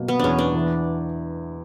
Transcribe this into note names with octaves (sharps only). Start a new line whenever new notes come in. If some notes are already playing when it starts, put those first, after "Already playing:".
Already playing: B2 F#3 A#3
B3
E2 C#4 D4
D4
E3